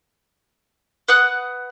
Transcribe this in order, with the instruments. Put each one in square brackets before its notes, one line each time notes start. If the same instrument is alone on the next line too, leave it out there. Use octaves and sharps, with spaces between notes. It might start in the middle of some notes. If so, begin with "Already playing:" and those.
[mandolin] B4 F#5 D#6 F#6